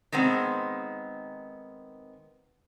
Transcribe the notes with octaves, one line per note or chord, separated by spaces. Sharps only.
D#3 G#3 B3 C4